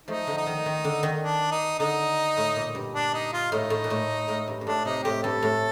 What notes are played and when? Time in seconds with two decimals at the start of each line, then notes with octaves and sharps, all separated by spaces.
0.07 F3 A3 D#4
0.27 D3 F3
0.37 D#4
0.46 D#3
0.66 D#3
0.84 D3
1.03 D#3
1.22 D4
1.51 D#4
1.79 D3 D#4
2.37 A2
2.56 A#2
2.75 G2
2.94 D4
3.14 D#4
3.33 F4
3.52 A2 D#4
3.70 A2
3.84 A#2
3.90 A2
4.29 A2
4.48 G2
4.61 G2
4.66 A2 D4
4.85 C3 D#4
5.04 A2 G4
5.23 G2 A4
5.42 A2